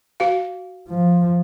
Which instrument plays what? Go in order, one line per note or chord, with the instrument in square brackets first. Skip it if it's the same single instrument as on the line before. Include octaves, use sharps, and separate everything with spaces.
[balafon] F#4 F5
[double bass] F3